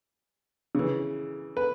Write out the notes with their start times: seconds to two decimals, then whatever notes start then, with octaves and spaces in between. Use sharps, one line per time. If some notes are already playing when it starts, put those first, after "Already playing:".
0.75 C#3 E3
1.57 B4